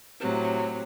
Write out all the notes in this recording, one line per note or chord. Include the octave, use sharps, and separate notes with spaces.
A2 C3 F#3